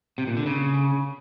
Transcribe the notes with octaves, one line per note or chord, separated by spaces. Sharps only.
C3
A#2
D3
C#3